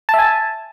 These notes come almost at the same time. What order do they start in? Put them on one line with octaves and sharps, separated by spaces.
A5 E5 G#5